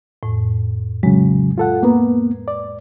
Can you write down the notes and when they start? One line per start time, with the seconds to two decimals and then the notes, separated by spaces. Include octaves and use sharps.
0.23 F2 A2
1.03 C#3 F#3 G#3
1.58 F4 A4 F#5
1.83 A#3 B3 B4 A#5
2.48 D5